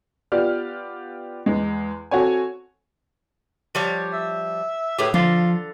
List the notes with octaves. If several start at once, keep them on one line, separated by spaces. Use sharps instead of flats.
B3 F4 G4 D5 F6
E2 G#3
C4 F#4 A4 C#5 G#5
F3 G3 C#5
E5
A2 G4 G#4 B4
D3 F3 F4